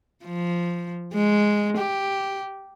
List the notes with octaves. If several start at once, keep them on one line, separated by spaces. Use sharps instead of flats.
F3
G#3
G4